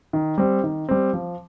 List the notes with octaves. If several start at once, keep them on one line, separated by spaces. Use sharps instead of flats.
D#3
G3 C4
D#3
G3 C4
F3